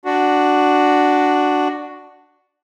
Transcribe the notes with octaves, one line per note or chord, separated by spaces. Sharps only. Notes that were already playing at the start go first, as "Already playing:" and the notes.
D4 F#4